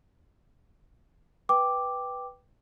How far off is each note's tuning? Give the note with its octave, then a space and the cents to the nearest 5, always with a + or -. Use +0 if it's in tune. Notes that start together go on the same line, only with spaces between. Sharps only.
B4 +0 G5 +0 D6 +0